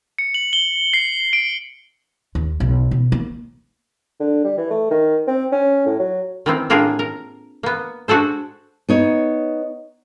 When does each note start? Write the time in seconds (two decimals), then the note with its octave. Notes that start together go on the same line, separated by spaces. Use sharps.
0.18 C#7
0.34 F#7
0.53 G7
0.94 C7
1.33 D7
2.35 D#2
2.60 B1
2.91 B2
3.12 A#3
4.20 D3
4.44 G3
4.58 E3
4.70 A3
4.91 D#3
5.27 C4
5.52 C#4
5.86 A2
5.99 F#3
6.46 D#3 E3 C4
6.70 A2 A#3 D4 F4 G#4
6.99 A#4
7.63 A#3 B3
8.08 D4 F#4 G#4 A4 C5
8.89 B3 D#4 C#5